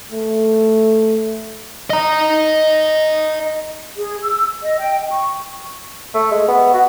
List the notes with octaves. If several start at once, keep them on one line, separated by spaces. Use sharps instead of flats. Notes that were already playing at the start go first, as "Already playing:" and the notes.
A3
D#5 A#5
G#4
E6
D#5
G5
C#6
A3
G#3
B3
F#4